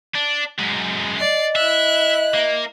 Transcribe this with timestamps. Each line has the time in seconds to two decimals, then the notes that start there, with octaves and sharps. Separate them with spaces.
0.15 D4
0.59 F#2 G#3
1.19 D5 D#5 C7
1.56 E4 E5 F#6
2.34 A#3